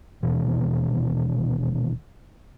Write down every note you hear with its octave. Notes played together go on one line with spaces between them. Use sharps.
D#1 D#2 B2 E3